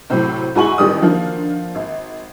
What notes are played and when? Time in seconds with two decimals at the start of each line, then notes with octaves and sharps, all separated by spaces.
0.10 A2 C3 F#3 C4
0.55 G#2 E4 F#4 G#5 C#6 F#7
0.78 A1 D#3 G3 G4 D#6
1.01 D3 D#3 F3 A#3
1.75 G#1